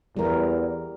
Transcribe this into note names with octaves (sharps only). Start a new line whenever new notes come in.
E2 G3 A#4